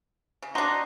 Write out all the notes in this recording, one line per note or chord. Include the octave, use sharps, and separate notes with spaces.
C#3
D4 D#4 F#4 A#5 C6